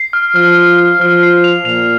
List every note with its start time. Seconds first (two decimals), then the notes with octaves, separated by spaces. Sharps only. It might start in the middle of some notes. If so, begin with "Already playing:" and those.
Already playing: C7
0.13 F6
0.35 F3 F6
0.57 F6
0.79 F6
1.01 F3 F6
1.23 C7
1.44 F7
1.65 A#2 F7